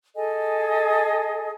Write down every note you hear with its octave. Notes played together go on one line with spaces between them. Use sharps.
G#4 A4 D#5 G#5